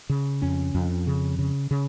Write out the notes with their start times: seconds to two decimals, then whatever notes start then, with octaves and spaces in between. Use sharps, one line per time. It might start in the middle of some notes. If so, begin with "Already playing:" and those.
0.09 C#3
0.42 F2 C#4
0.75 F2
1.07 C#3
1.39 C#3
1.71 C#3